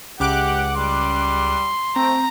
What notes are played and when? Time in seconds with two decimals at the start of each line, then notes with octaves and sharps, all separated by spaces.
0.20 C#2 G4 F#5 D6 F#6
0.76 G3 C6
1.96 A3 C4 A#5